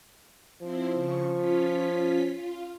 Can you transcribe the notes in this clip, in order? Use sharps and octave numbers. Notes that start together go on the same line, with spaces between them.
F3 C4 E4 C5
C#3 C#6
C#4 F4 B6
F4